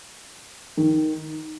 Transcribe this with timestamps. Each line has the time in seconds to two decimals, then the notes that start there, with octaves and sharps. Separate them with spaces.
0.77 D#3